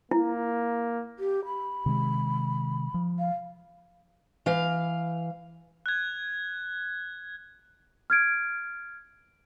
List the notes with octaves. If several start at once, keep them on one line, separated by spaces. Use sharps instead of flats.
A#3 E4
G4
B5
C3 D#3 G#3
F3
F5
E3 F5
F#6 G#6
F6 G#6 D7